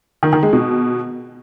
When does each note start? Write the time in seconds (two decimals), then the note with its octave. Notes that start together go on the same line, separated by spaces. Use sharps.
0.23 D#3
0.33 D#3
0.43 G#3
0.53 B2